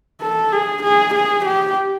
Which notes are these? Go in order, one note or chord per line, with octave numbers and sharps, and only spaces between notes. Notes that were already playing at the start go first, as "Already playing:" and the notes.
A4
G#4
G#4
G#4
G4